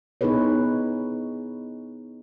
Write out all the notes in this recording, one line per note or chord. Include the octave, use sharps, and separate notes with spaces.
B3 D#4 E4 G#4 B4 C#5